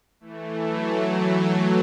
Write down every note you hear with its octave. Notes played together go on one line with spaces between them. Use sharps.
E3 A3
F#3
F#3